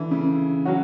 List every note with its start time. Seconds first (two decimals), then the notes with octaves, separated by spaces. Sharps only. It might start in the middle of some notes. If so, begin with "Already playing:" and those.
Already playing: D3 E3
0.11 C#3
0.65 F#3 C#4 F#4